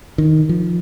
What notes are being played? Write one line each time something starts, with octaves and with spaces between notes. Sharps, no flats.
D#3
F3